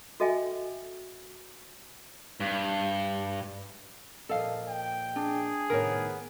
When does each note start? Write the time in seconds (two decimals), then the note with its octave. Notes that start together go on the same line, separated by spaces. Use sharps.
0.20 F#4 A4 D#5 E5 G5 G#5
2.40 G2
4.29 A#2 F3 A4 D#5 F5
4.68 G5
5.16 D4 G#4
5.70 A2 C3 D#3 B3 A#4 C#5